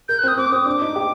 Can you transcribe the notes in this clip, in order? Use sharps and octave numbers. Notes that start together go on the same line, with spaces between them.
A#4 G6
F#6
C4 D#6
C4 D6
C4 D#6
D4 D6
D#4
G4